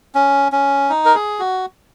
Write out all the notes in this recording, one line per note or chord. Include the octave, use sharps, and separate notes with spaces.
C#4
C#4
D#4
A#4
G#4
F#4